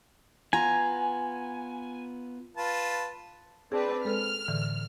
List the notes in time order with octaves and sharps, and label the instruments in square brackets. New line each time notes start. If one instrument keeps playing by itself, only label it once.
[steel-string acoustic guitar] B3 F4 A#5 [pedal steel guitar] G#5
[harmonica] F4 B4 A5
[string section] C4 D4 B4 [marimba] G#4 C5
[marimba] G#3 A4 B4 [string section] F6
[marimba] A2 D3 E3